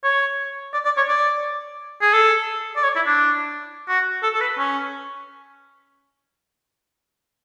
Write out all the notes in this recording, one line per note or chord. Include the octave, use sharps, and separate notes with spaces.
C#5
D5
D5
C#5
D5
G#4
A4
D5
C#5
E4
D4
F#4
A4
A4
B4
C#4